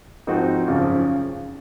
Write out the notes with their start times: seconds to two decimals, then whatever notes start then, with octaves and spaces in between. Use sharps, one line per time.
0.27 G#2 F3 C4 D#4 F#4
0.67 G#1 F#2 C#3 F3